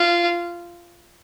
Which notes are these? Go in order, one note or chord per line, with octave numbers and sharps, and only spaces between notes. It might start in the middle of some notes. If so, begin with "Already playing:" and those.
Already playing: F4